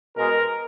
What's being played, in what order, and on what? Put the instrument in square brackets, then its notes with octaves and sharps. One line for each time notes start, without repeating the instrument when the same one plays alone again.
[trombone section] B2 G#3 A#4